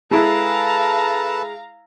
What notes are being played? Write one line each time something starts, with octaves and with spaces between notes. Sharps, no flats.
G#3 E4 G#4 A4 B4 F5 A5 A#5